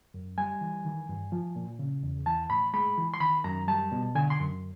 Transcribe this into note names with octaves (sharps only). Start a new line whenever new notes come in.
F#2
G3 G#5
E3
D#3
G2
F3
A#2
C#3
E2
E3 A5
A2 B5
G#3 B5
E3
C6
D#3 B5
F#2 A#5
G3 A5
B2
D3 G#5
C6
F#2